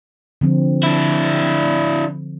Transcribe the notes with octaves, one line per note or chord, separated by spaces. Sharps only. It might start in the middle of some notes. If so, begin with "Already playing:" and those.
D3 F3 C4
D4 E4